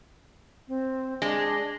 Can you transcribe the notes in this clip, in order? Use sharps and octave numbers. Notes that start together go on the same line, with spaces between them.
C4
G#3 D4